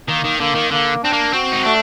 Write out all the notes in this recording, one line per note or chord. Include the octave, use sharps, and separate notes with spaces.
D#3 A#3
D#3
D3 A#3
D#3
D3 A#3
C4 D4
A#3
C4 F#4
D#4
A3 D4